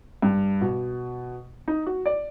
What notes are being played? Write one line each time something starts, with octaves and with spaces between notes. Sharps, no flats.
G2
B2
D#4
F#4
D5